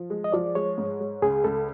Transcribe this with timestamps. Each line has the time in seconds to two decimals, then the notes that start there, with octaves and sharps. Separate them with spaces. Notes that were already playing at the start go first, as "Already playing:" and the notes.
Already playing: F3
0.10 G#3
0.24 D#5
0.33 F3 D5
0.55 G#3 C#5
0.78 G#2
1.00 G#3
1.22 C#2 G#4
1.44 C#2 A4